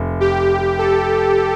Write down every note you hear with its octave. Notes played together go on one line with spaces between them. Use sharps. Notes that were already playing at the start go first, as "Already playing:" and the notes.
Already playing: F1
G4
A4